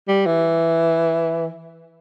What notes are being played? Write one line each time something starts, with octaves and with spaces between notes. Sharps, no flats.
G3
E3